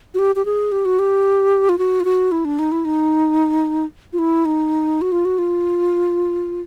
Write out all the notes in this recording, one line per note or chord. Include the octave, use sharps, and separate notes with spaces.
F#4
G4
G4
G#4
G4
F#4
G4
F4
F#4
F4
F#4
E4
D4
D#4
E4
D#4
F4
E4
D#4
F#4
F4
F#4
F4